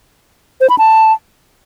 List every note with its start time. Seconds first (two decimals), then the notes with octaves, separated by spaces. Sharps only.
0.61 C5
0.70 B5
0.78 A5